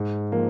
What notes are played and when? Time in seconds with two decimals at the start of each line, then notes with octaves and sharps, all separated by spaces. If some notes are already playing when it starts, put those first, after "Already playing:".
Already playing: G#2
0.32 F3 A#3